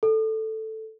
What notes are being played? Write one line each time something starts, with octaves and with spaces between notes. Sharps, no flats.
A4